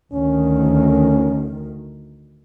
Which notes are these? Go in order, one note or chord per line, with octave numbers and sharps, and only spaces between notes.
D2 D#3 C#4